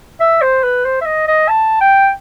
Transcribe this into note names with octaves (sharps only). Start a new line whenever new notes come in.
E5
C5
B4
C5
E5
D#5
D#5
A5
G5